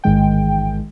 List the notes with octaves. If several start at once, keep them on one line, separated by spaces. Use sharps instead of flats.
A1 G#2 D#3 G#3 G5